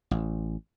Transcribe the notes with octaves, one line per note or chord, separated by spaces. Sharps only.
A1